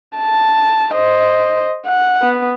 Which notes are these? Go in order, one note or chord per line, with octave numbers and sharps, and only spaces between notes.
A5
C5 D#5
F#5
B3